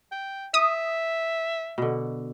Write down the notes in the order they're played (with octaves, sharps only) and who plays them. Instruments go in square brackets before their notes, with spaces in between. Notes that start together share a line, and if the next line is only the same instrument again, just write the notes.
[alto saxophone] G5
[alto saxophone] E5 [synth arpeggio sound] D#6
[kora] B2 D3